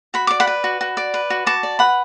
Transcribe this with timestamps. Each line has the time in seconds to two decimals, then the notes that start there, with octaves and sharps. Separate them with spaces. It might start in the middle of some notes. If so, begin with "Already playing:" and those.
0.14 F#4 B5
0.27 D5 D6
0.40 F#5 B5
0.47 B4
0.64 F#4
0.81 F#4
0.97 D5
1.14 B4
1.30 F#4
1.46 F#4 A5 D6
1.63 D5
1.79 B4 F#5 B5